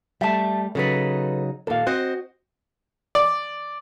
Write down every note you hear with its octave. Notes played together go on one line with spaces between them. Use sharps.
G3 A3 E5 A5
C#3 F#3 D#4 A4 B4
D#2 A#2 A4 F5
C4 F#4 C5 D#5
D5